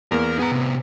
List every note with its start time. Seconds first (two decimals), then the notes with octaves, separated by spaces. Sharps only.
0.12 E2 A#3 A#4
0.39 B3 G#4 A#5
0.52 A2 C3